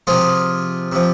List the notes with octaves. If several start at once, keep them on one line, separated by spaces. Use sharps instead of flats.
C3 F3 F4 G#4
C3 F3